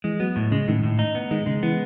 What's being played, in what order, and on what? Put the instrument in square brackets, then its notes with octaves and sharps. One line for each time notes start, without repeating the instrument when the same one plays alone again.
[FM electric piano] E3 [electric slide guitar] G#3
[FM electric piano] F#3 [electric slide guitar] B3
[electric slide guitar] A2
[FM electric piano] C#3 [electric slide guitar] G#3
[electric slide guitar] A2 [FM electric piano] D#3
[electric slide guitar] A2
D#4
B3
[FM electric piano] D#3 [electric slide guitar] G#3
[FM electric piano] C#3 [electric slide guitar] G#3
[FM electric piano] E3 [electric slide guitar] B3